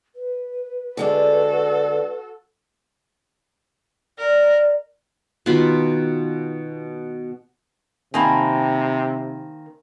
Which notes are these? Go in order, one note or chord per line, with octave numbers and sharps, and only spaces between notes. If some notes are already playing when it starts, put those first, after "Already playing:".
B4
D3 G#3 D4 F#4 A4
A#4 D5
B2 D#3 F4 B5
C3 D#3 A#3 C4 G#5 A5 B5